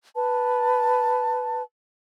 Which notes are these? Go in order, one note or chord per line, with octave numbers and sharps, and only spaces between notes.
B4 A5